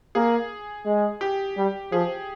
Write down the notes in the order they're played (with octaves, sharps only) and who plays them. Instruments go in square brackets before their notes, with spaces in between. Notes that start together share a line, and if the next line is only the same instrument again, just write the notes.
[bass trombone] A#3 [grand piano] G#4
[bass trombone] G#3
[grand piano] G4
[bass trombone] G3
[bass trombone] F3 [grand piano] G#4